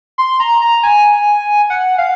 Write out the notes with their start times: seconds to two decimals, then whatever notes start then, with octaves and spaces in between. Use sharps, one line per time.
0.18 C6
0.40 A#5
0.61 A#5
0.83 G#5
1.70 F#5
1.98 F5